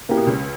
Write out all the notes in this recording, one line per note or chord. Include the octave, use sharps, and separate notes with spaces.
C#3 A#3 E4 G4
B2
C#2 C#3